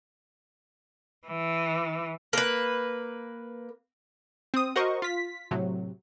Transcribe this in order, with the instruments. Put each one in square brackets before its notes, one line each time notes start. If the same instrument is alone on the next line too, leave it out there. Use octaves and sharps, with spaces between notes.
[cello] E3
[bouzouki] A#3 B4
[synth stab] C4 D#6
F#4 A#4 C5 D#5 C#6
F4 B6
A2 C3 F#3